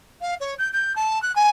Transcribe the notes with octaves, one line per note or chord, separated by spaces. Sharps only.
F5
C#5
G6
G6
A5
F#6
G#5